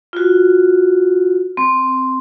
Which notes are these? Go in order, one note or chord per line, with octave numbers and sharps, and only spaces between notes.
F4 F#4
C4